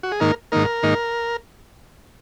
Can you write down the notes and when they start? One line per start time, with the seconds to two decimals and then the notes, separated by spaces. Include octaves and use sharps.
0.03 F#4
0.12 G#4
0.20 G#2 D#3 A#3 D#4 A#4
0.52 G#2 D#3 A#3 D#4 A#4
0.83 G#2 D#3 A#3 D#4